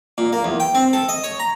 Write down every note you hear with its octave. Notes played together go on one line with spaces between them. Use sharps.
A#2
A#3
E2
G5
C4
A4
D#5
C#5
A#5